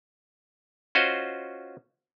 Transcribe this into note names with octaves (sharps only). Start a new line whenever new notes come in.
C#4 F4 F#4 C5 D#5